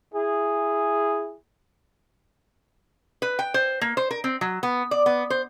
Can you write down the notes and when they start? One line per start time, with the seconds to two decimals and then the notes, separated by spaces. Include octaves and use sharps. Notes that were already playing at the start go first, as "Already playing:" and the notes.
0.14 E4 G#4
3.22 B4
3.39 G5
3.54 C5
3.81 A#3
3.97 C5
4.11 A#4
4.24 C4
4.41 F#3
4.63 B3
4.91 D5
5.06 B3
5.30 C5